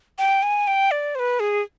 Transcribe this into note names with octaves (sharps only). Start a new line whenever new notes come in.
G5
G#5
G5
D5
C5
B4
G#4